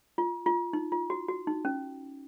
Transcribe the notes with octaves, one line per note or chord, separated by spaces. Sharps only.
F4
F4
D#4
F4
F#4
F#4
D#4
C#4